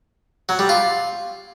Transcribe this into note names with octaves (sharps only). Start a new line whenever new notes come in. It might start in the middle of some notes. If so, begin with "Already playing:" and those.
F#3
G3
F4